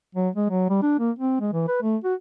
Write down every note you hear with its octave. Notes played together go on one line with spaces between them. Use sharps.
F#3
G#3
F#3
G3
D4
A#3
C4
G#3
E3
B4
A3
F#4